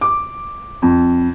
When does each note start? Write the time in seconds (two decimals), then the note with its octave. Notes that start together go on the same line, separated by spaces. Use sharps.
0.01 D6
0.82 F2